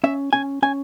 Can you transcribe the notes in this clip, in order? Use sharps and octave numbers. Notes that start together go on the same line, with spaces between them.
C#4 E5
C#4 G#5
C#4 G#5